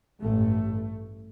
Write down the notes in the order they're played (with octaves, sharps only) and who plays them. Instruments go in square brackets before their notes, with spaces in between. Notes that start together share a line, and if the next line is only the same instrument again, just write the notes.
[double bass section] A1 G2 A3